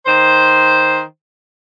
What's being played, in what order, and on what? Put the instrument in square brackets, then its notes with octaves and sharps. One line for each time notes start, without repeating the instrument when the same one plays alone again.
[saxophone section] D#3 C5